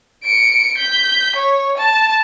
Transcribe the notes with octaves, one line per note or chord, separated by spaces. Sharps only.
C#7 D7
G6 B6
C#5
A5